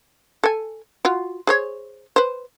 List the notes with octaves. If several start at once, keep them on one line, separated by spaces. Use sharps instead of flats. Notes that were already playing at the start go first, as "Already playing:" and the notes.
A4 G#5
F4 F#4
G#4 C5 C#5
B4 C5